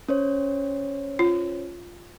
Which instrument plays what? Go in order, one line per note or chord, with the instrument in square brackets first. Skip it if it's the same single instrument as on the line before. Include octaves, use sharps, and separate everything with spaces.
[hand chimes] C#4 C5 C#5
[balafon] F4